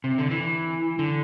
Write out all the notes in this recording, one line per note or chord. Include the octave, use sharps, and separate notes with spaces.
C3
D3
E3
D3